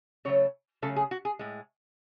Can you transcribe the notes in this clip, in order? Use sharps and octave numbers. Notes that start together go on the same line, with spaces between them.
C#3 F#3 A3 C#5
C#3 F#3 A3 A4
G#4
F#4
G#4
A2 G#3